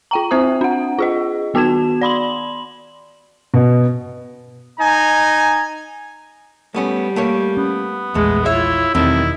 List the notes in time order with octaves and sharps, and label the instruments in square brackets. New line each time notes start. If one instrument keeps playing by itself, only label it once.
[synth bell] F4 G5 A#5
C4 C5 E5 D#6
D4 F#5
F4 G#4 D#5
D#3 B3 F#4 A5 G#6 E7
D5 B5 C6 F#7
[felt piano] B2
[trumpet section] D#4 G#5 A#5
[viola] G3 [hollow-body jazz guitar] A3 B3 C#4
[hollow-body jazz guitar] A3 A#3 C#5
[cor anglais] B3 [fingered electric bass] C#4
[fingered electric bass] A#1 E2 [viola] G#3 [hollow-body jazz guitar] A3
[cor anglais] E4 [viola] F4 C#5 [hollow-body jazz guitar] E5
[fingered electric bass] E1 E2 [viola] D#3 [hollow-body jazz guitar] G3 A3 C4 [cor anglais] E4